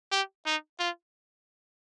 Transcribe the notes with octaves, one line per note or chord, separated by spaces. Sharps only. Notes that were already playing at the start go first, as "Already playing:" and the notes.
G4
D#4
F4